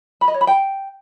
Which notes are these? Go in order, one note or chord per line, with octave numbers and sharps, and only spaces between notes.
B5
D#5
C#5
B5
G5